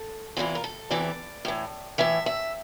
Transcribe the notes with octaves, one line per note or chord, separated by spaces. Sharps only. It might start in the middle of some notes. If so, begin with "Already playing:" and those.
Already playing: A4
E2 C3 E3 F4
A#4
A4
E2 C3 E3 D5
A2 E3
A2 E3 E5
E5